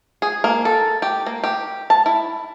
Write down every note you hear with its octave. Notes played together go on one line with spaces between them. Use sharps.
G#4
A#3
A4
G4
A#3
G4
A5
E4